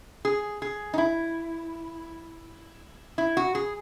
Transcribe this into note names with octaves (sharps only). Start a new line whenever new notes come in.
G#4
G#4
D#4
E4
E4
F#4
G#4